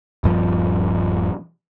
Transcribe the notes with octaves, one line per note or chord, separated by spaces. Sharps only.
D#1 G2 F3